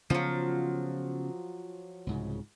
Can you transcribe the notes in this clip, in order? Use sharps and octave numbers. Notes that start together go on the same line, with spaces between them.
C#3 F3 F#3 B3
C2 G#2 C#3